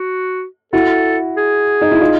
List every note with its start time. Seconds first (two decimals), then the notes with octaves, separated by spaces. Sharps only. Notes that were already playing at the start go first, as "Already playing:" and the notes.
Already playing: F#4
0.73 E4 F#4 A4
1.37 G#4
1.81 D#4
1.91 E4
2.01 D#4 F4